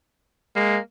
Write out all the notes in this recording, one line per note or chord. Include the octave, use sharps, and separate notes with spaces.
G#3 A#3